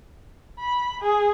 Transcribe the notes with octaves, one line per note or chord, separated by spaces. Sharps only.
B5
G#4